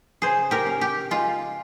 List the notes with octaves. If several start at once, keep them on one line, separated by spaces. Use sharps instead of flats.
C#3 G#4 C5
G4 A#4
C#4
G4
G#3 F4